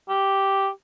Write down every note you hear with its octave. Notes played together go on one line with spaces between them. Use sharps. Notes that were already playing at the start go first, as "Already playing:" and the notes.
G4